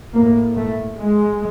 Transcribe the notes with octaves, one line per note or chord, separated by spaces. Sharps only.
A2 A#3
A3
G#3